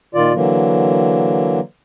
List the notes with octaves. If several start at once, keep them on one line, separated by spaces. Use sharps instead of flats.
A#2 D#3 F4 D5
D3 E3 F#3 A#3